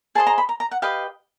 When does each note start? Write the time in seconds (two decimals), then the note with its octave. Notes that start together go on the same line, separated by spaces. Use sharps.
0.15 G#4 C5 D#5 A5
0.27 A#5
0.38 B5
0.49 A#5
0.60 A#5
0.71 F#5
0.82 G4 B4 D#5 F5